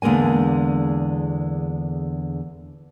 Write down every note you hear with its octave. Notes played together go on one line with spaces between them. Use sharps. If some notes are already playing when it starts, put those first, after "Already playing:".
E2 D3 G#3 A#3 G#5